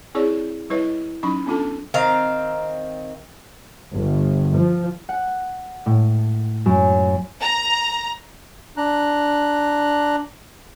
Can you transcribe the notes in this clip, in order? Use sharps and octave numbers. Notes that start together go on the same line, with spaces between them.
C4 E4 G#4 C#5 D5
G3 E4 B4 C#5 D#5
F#3 C#4 D#4 B5 C#6
B3 C#4 D4 F4 A4 A5
D#3 C4 F5 A#5
G1
F3
F#5
A2
F#2
A#5
D4 A#5 F#6